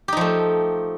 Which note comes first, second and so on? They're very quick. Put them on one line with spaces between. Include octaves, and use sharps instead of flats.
G4 D#4 F3 A3